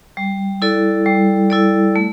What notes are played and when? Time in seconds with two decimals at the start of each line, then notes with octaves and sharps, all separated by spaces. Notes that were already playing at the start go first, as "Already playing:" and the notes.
0.17 G3
0.62 E4 A4 D5
1.06 G3
1.50 E4 A4 D5
1.96 A3